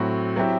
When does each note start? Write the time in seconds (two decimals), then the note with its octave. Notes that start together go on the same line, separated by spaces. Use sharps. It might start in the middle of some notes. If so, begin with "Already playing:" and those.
Already playing: A2 F#3 C4 F#4
0.36 F#3 C4 E4 G4